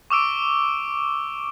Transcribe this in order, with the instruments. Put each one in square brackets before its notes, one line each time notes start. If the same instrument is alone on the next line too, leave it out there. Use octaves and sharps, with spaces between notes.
[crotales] C#6 D6 E6 D7